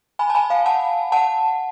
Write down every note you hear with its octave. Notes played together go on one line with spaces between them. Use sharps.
G#5 B5
A5
G#5 B5
F5 G#5
F#5 A5
F#5 A5